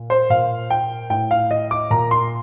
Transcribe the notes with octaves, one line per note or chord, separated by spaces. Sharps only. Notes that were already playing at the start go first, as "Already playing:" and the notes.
Already playing: A#2
C5
A#2 F5
G5
A2 G5
F5
D#5
D6
A#2 A#5
C6